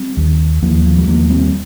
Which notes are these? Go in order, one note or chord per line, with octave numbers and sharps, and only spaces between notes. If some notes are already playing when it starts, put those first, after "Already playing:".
Already playing: G3 C4
D#2
D#2 F3 A#3
F3
G3
D#2 F3 A#3
G3 C4